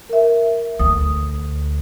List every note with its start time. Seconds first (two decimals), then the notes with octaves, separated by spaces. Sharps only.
0.09 A#4 E5
0.79 D2 D#6